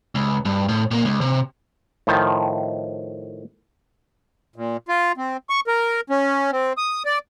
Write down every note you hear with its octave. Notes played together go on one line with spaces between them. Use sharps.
C#2
G2
A2
A#2 A#3
C#2
C3
A2 D#3 F3
A#2
F4
C4
C#6
A#4
C#4
C4
D#6
D5